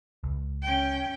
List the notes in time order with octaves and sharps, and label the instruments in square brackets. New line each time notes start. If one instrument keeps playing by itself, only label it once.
[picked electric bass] C#2
[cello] C#4 G5